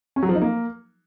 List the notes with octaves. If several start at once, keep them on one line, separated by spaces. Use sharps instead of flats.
C#4
F#3
F3
D#4
A#3